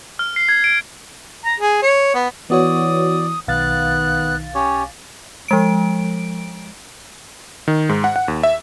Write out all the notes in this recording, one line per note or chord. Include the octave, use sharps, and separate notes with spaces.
F6
C7
G#6
D7
A#5
G#4
C#5
B3
E3 B3 F#4 C#5 D5 D#6
B1 D#3 B3 F5 F#6 A6
C#4 G4 C#5
F3 G#3 D7
D#3
G#2
F#5
F#5
D#2
E5